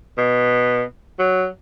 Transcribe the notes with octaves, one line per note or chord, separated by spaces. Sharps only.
B2
F#3